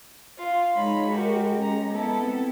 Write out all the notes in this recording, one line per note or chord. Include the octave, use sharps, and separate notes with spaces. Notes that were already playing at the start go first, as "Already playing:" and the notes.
F4
G#3 D#4 C#5 B5
F#4 G4 A#4
C#4 A#5
B3 E4 A4
C4